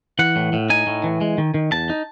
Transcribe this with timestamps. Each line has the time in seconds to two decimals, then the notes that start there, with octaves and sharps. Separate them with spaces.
0.19 E3 F#5
0.36 A2
0.53 A2
0.70 D#4 G#5
0.87 A2
1.04 E3
1.21 G#3
1.38 D#3
1.54 D#3
1.72 E2 A5
1.90 D#4